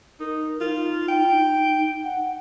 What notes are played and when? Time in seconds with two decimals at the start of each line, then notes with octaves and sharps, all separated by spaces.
0.20 D#4 A#4
0.61 D#4 F4
1.08 G5
2.04 F#5